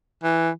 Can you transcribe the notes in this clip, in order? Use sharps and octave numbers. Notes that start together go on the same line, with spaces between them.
E3